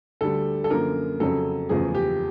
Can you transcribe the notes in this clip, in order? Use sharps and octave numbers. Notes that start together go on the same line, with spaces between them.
D2 D3 G3 A4
A4
F#2 D3 F3 A#3 A#4
F2 C#3 F#3 A4
F#1 E2 C#3 F3 A3 G#4
G4